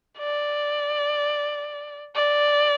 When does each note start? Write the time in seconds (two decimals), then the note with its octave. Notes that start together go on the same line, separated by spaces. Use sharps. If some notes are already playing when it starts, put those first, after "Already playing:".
0.18 D5
2.15 D5